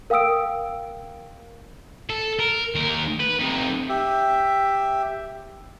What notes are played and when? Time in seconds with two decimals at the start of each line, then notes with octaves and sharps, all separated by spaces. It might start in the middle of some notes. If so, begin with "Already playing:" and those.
0.10 A#4 F5 G5 D#6 E6 D7
2.10 A4
2.40 A#4
2.75 D#2 A#4
3.20 B4
3.39 C3 D#4
3.89 G4 E5